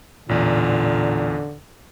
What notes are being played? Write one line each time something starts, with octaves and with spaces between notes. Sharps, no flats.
A1 E2 A#2 D3